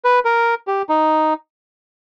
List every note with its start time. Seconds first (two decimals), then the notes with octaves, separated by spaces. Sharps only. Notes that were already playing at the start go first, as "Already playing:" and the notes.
0.05 B4
0.25 A#4
0.67 G4
0.89 D#4